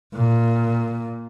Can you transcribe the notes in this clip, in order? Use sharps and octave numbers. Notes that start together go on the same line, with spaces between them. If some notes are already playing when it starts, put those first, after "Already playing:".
A#2